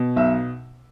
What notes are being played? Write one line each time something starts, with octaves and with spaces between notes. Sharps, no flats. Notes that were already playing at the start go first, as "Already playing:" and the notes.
Already playing: B2
B1 E5